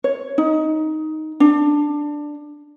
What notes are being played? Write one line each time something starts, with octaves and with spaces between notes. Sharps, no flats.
C#5
D#4
D4